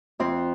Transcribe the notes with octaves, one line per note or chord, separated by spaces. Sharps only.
F2 C4